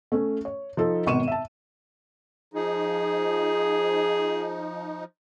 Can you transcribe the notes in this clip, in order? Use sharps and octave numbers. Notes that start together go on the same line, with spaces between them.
A3 C#4
C#5
F3 D#4 A4
G#1 B2 C#6 D#7 E7
E5 A5
F3 D#4 G#4